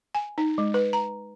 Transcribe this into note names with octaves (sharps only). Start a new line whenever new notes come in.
G#5
D#4
G#3
B4
A#5